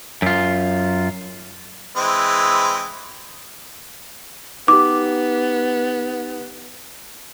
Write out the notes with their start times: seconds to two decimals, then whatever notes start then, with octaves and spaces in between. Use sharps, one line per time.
0.22 F#2 F4
1.96 E3 G#3 C4
4.68 B3 D#4 G4 D6